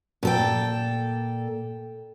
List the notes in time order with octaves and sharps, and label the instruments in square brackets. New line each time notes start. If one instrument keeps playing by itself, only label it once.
[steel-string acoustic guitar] A#2 A4 G5